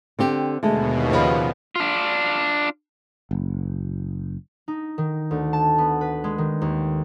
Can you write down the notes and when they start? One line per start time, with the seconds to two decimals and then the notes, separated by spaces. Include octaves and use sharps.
0.19 D3 C4 G4
0.63 D#2 B2 D3 G#3 A3
1.11 C#3 F3 B4
1.76 D4 F4
3.31 F#1
4.68 D#4
4.98 D#3
5.31 D2
5.53 A5
5.78 B3
6.01 B4
6.24 G#3
6.38 D#3
6.61 D#2